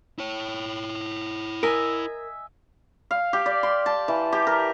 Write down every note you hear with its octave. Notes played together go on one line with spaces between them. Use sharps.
E4 C#5
A#4 D#5 E5 G#5
F5
G4
D5
C6
A5
E3
G4
A#4